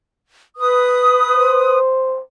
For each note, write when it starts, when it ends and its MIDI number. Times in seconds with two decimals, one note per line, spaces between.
0.57 1.79 71
0.57 1.79 87
1.35 2.21 72